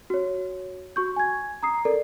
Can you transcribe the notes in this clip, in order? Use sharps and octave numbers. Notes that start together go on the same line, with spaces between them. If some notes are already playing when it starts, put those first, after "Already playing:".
F#4 C#5
F#4 C#6 G6
G#5 G#6
A#5 D#6 C7
A4 A#4 D5